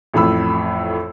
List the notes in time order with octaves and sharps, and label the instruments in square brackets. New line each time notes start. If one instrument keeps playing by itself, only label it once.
[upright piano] A1 F2 A2 B5 E6